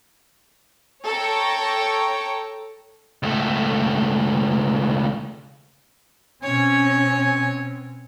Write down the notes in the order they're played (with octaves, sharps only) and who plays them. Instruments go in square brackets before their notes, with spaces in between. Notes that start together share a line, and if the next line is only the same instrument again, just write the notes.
[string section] A4 C#5 G5 A#5 C#6
[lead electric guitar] C#2 A3
[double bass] B2 C4 [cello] C#4 [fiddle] C#5 [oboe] G#5